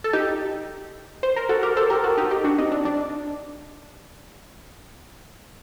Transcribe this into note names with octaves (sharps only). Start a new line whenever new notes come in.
A4
D#4 G4
C5
A#4
F#4 A4
G4 A#4
A4 C5
G4 A#4
F#4 A4
D#4 G4
D#4 G4
D4 F#4
C4 D#4
D4
D4